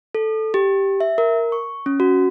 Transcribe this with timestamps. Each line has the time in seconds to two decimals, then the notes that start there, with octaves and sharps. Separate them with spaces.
0.15 A4
0.54 G4
1.00 E5
1.18 A#4
1.52 C#6
1.86 C#4
2.00 F#4